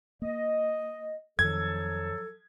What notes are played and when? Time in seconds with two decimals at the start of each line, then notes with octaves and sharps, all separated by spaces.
0.22 A#3 D#5
1.39 F2 D#3 F3 F#3 A4 G#6